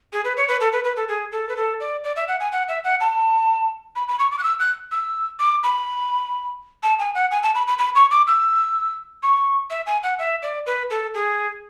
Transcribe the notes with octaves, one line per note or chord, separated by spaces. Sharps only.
G#4
B4
C#5
B4
A4
B4
B4
A4
G#4
A4
B4
A4
D5
D5
E5
F#5
G#5
F#5
E5
F#5
A5
B5
B5
C#6
D6
F#6
E6
F#6
E6
D6
B5
A5
G#5
F#5
G#5
A5
B5
B5
B5
C#6
D6
E6
C#6
E5
G#5
F#5
E5
D5
B4
A4
G#4